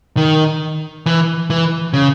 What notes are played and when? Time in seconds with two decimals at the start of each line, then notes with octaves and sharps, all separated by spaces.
0.17 D#3
1.06 E3
1.50 E3
1.94 C#3